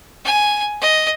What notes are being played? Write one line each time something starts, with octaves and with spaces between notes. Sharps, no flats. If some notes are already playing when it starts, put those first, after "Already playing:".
G#5
D#5